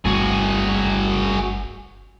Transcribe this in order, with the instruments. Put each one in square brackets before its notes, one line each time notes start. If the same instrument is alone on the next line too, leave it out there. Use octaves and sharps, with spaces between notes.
[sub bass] G1 [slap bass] C2 G2 A3 [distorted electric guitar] F#4 G#4